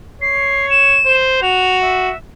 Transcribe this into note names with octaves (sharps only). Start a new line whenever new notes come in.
C#5 C7
E7
C5
F#4 F7
E5